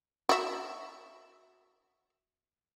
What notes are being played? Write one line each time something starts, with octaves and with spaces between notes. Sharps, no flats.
F#4 E5